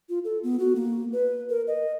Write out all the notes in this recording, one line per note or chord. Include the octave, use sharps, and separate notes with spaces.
F4
A4
B3
F#4
A#3
B4
A#4
D#5